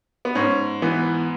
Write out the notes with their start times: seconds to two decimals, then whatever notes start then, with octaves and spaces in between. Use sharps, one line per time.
0.25 B3
0.35 G#2 C#4
0.82 E3 B3